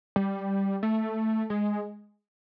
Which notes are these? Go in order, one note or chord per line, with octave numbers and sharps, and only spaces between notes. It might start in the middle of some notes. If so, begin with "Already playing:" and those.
G3
A3
G#3